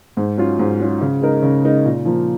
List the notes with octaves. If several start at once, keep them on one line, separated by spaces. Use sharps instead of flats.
G#2
F#3 C#4 F4
G#2
F#3 C#4 F4
C#3
G#3 D#4 A#4
C#3
G#3 D#4 A#4
A#2
F3 A#3